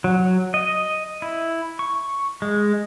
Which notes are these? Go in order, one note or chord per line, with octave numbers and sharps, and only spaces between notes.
F#3
D#5
E4
C#6
G#3